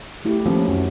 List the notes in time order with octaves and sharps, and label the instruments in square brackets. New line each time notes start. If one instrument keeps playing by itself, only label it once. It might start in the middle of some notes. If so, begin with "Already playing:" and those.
[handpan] A3 E4 G4
[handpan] D#3 C4 C#4 [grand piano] F3 A#3
[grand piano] F#2